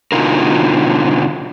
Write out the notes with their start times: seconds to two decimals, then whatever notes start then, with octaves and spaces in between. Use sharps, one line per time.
0.12 B2 D3 D#4 F4 A#4